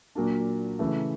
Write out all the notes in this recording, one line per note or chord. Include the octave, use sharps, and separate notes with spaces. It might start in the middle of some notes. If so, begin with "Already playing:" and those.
A#2 F#3 A#3 D4
C#3 E3 A3